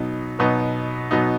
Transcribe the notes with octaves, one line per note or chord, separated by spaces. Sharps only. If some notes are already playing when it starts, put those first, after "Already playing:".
Already playing: B2 F#3 B3 D#4
B2 F#3 B3 D#4
B2 F#3 B3 D#4